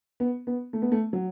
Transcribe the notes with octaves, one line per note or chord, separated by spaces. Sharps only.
B3
B3
A3
B3
A3
F#3